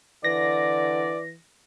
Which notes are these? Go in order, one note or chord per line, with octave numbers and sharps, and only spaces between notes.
D3 E3 D5 A#6